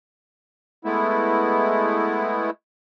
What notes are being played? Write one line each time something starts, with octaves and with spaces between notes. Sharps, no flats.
G#3 A3 B3 E4